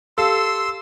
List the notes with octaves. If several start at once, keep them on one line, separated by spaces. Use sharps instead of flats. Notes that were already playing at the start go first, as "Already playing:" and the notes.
G4 A4 F5 C6 E6 C7